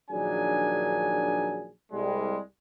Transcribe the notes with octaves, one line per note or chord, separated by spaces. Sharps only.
A#1 D#3 F#3 D4 G#4 G#5
C2 G3 G#3